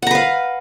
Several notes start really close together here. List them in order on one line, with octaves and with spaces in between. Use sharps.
F#5 A#5 B4 F5